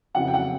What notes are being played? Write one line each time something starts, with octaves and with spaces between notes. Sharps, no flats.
F2 C#3 F#3 B3 E4 F#5
G5
F#5